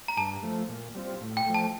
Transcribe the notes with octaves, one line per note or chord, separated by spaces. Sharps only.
A#5
G2 A5
F3 A3
A#2
G3 C4 F4
A2
G5
F3 A3
A5